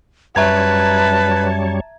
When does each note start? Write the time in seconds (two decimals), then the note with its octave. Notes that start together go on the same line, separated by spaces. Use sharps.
0.36 F#2 G3 B4 C#5 E5 A5 A#5 G#6